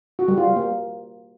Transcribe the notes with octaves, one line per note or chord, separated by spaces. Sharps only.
F#4
G3
F4
G3
A#3